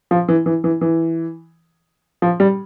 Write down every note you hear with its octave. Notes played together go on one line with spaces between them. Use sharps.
F3
E3
E3
E3
E3
F3
G3